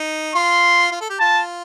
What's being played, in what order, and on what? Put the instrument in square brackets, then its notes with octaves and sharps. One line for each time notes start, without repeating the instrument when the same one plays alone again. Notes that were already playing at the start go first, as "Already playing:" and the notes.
Already playing: [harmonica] D#4
[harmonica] F4 [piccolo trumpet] C6
[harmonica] F4
A4
G4
[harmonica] F4 [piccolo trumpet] A5